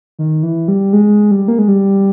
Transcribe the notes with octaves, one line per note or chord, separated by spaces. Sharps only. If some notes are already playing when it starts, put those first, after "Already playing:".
D#3
E3
G3
G#3
G3
A#3
G#3
G3